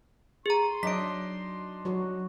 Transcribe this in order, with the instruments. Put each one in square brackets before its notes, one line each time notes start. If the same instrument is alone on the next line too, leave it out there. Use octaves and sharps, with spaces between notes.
[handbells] G#4 A#5 [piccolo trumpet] C6
[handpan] F#3 [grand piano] D4 D#4 D#5 [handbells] B6 D7
[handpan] F#3 F#4